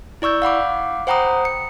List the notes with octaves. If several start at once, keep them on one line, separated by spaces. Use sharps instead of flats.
E4 D5 C#6 E6 G6
F5 F#5 B5 D6
C5 F#5 G5 A#5 B5 D#6
C#7